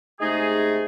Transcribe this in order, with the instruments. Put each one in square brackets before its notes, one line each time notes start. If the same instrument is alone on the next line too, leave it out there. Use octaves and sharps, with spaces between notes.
[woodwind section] C3 G#3 A3 D#4 G#4